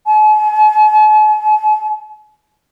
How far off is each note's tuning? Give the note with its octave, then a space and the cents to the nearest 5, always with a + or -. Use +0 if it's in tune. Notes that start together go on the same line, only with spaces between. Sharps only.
G#5 +45